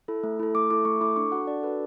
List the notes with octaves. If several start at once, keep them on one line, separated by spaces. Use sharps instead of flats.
E4 A4
A3
E4 A4
A3 D6
E4 A4 D6
A3 C#6
E4 A4 D6
D4 C#6
F#4 A4 F#5
D4 D5
F#4 A4 B4